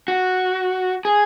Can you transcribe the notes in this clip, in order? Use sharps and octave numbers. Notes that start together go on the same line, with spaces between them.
F#4
G#4